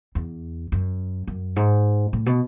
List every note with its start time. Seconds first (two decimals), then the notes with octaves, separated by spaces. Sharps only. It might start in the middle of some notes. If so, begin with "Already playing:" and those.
0.15 E2
0.72 F#2
1.27 F#2
1.56 G#2
2.13 A2
2.26 B2